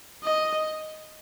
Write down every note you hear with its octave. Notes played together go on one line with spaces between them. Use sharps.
D#5